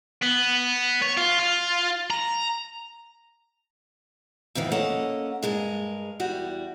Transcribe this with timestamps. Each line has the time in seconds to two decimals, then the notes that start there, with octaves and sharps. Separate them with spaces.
0.23 B3
1.02 C#5
1.17 F4
1.39 F4
2.10 A#5
4.55 F2 G#2 D#3 E3
4.72 A#3 C#4 A4 D#5 F#5
5.43 G2 G#3 A#4
6.20 E2 G3 F#4